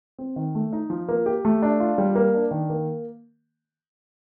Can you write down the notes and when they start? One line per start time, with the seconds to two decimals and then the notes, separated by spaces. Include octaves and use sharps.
0.18 C4
0.36 D#3
0.55 A3
0.73 D#4
0.90 F3
1.09 A#3
1.26 G4
1.45 A3
1.63 D4
1.80 F4
1.98 G3
2.15 A#3
2.34 D4
2.51 D#3
2.70 A#3